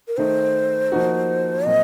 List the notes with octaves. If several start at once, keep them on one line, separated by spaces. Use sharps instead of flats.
A#4
D#3 A3 D#4 C5
F3 A#3 D#4 F#4
A#2 F#3 C4 D#5